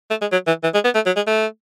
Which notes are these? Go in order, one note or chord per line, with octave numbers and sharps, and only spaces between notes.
A3
G#3
F#3
E3
E3
G#3
B3
A3
F#3
G#3
A3